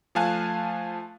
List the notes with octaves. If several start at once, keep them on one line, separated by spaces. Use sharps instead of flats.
F3 A3 F5 G#5 A5 F#6